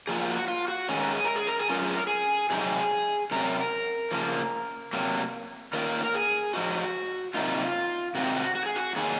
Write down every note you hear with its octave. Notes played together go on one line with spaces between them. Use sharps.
F3 A#3 F4 G#4
F#4
F4
F#4
D#3 G#3 C#4 G#4
A#4
G#4
A#4
G#4
A#4
G#4
F#3 C#4 F4 A#4
G#4
A#4
G#4
C3 F#3 C4 D#4 G#4
C3 F#3 C#4 A#4
C#3 F3 A#3
C3 F#3 A#3
D#3 A#3 C#4 F4 A#4
A#4
G#4
F3 G#3 D#4 F#4
C3 D#3 F#3 A#3 D#4 F4
C3 D#3 G#3 C4 D#4 F#4
F#4
F#4
G#4
F#4
D#3 F#3 A#3 G#4